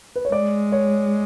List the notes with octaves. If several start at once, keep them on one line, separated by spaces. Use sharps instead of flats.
B4
C#5
G#3 D5
C#5